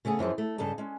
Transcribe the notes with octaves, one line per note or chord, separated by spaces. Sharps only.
C#3 A3 B3 G#4
F#2 E3 F3 G#4
A3
G2 C#3 A4 D#5 A5
G#3 C#4